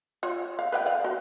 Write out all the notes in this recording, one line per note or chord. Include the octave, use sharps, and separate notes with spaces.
F4 C#5
F5
B4 F5 G5
D5 F5
F#4